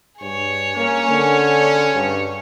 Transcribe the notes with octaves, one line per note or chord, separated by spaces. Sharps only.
G2 G#4 C#5
A#3 C#4
D3
G2